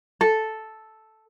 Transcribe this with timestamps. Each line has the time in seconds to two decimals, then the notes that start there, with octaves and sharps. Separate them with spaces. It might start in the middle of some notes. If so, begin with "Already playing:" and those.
0.21 A4